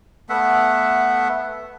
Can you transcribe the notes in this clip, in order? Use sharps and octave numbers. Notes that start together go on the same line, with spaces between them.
A3 B3 E5 F#5